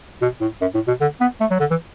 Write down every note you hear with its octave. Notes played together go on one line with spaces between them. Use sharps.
B2
A2
F#2
A2
B2
D3
B3
A3
F#3
D3
E3